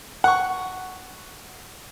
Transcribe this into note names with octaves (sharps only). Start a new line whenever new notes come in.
F#5 C#6